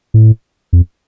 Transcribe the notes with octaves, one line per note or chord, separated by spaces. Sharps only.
A2
F2